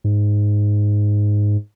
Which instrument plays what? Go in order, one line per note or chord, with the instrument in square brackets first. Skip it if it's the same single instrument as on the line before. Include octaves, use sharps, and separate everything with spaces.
[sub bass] G#2